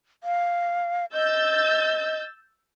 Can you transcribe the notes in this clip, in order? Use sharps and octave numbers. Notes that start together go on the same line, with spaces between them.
F5
D#5 E6 G6 A6